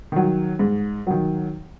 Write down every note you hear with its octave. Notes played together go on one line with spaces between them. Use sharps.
D#3 F#3
G#2
D#3 F#3